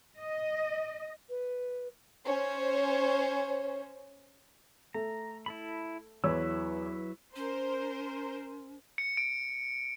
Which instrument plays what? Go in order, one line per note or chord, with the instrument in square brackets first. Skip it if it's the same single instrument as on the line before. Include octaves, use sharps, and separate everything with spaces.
[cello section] D#5
[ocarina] B4
[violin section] C#4 C5 C#5
[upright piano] A3 [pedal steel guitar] A#5
[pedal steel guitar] E4 A4 B5
[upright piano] E2 C#5 E6 [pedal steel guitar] F#3 E4 B4
[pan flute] C#4 [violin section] A#4 C5
[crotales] C#7
D7